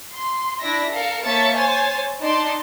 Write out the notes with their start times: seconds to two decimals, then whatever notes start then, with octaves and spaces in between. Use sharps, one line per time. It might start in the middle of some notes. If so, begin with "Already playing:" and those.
0.13 C6
0.61 D4 E4 D5 E5 A#6
0.91 A4 A#4 F5 C#7
1.24 A#3 C#5 E5 A5 A6 C#7
1.54 C5 C#5 G#5 A6
2.23 D4 D#4 D5 A5 C6